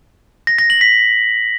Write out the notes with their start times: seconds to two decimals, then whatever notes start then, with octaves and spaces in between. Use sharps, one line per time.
0.47 A#6
0.59 A#6
0.70 F#7
0.81 B6